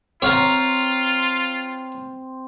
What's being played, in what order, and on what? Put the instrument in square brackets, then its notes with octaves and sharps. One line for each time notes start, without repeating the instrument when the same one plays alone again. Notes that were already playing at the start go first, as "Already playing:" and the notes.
[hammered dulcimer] C4 [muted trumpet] F4 [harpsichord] C#5 F5 A#5